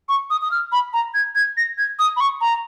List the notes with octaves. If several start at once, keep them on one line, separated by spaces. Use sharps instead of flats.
C#6
D#6
D#6
F6
B5
A#5
G#6
G#6
A#6
G#6
D#6
B5
C#6
A#5